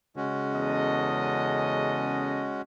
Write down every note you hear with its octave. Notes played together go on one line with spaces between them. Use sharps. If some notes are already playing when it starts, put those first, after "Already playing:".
C#3 G#3 C#4 F#4
E2 A4 D#5